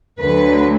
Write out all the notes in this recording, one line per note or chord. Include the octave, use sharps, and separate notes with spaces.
D2 D3 F#3 B4